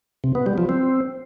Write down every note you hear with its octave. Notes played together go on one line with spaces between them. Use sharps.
C3
B3
G3
F3
C4